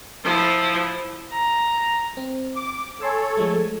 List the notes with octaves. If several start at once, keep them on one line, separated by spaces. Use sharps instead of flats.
F3 E4
A#5
C4
D6
A4 C#5 G#5 C6 E6
F3 G#3 A3